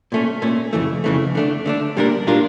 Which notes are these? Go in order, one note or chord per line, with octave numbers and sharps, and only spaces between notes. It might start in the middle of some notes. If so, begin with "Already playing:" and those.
A#2 A3 C#4
A#2 A3 C#4
F2 C#3 E3 A3
F2 C#3 E3 A3
D3 A3 D4
D3 A3 D4
A#2 G3 D4 F4 A#4
A#2 G3 D4 F4 A#4